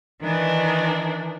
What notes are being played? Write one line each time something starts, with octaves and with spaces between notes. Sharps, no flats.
D#3 E3 D4